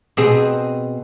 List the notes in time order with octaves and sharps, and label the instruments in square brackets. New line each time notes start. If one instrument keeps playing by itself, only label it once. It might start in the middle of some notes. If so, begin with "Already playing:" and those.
[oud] B2 C4 G#4